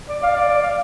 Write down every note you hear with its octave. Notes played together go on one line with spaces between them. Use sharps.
D5
F5
D5
D5
F5